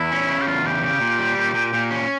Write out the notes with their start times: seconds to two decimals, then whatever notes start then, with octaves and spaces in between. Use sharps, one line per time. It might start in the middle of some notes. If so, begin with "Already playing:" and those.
Already playing: E2 E4
0.12 C#4
0.30 C#3
0.41 G4
0.47 E2 F4
0.65 C#3 G4
0.83 C#3 G4
1.01 A#2
1.19 G3
1.38 A#2
1.55 A#2
1.74 A#2
1.91 C#4